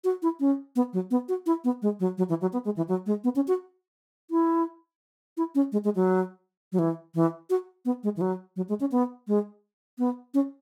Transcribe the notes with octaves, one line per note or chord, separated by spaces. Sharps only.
F#4
E4
C#4
B3
F#3
B3
F#4
E4
B3
G#3
F#3
F#3
E3
F#3
B3
G#3
E3
F#3
G#3
B3
C#4
F#4
E4
E4
C#4
G#3
G#3
F#3
F#3
E3
E3
F#4
B3
G#3
E3
F#3
F#3
G#3
C#4
B3
G#3
B3
C#4